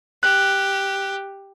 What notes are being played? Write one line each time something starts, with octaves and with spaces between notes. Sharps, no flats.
G4 F#6